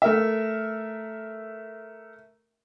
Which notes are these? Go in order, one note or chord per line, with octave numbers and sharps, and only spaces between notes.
A3 A#4 E5